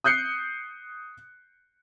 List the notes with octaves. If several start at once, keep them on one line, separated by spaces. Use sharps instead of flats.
D#6 F#6 G6 C7 C#7